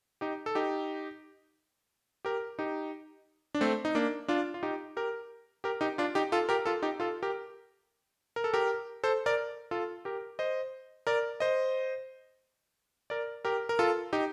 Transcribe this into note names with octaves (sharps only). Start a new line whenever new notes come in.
D#4 G4
A4
D#4 G4
G4 A#4
D#4 G4
D4
A3 C4
D#4
A#3 D4
D4 F4
F4
D#4 G4
G4 A#4
G4 A#4
D#4 G4
D4 F4
D#4 G4
F4 A4
G4 A#4
F4 A4
D#4 G4
F4 A4
G4 A#4
A#4
A4
G4 A#4
A4 C5
A#4 D5
F4 A4
G4 A#4
C5 D#5
A#4 D5
C5 D#5
A#4 D5
G4 A#4
A#4
F4 A4
D#4 G4